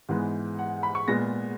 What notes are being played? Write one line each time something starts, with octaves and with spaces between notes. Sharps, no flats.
G#2 E3 G#3 B3
F#5
B5
C#6
A#2 G#3 B3 A#6